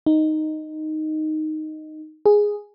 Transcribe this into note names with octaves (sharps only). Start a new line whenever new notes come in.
D#4
G#4